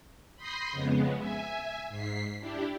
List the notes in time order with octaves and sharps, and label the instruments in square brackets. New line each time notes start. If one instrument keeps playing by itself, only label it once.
[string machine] B5 C6 D#6 G6 A#6 C7
F2 C#3 G#3 B3
E5 G#5
G#2 B6 C7
D4 E4 G4